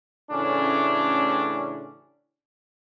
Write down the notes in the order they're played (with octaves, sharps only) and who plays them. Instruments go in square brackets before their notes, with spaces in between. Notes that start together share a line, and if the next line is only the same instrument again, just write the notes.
[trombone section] A1 A2 C#3 C#4 D4